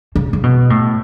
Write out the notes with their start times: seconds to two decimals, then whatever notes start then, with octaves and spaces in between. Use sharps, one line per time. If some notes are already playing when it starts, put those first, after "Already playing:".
0.15 C#3
0.33 C#3
0.43 B2
0.70 A2